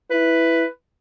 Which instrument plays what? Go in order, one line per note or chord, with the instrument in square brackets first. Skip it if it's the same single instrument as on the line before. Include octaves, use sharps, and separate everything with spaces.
[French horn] E4 [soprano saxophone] B4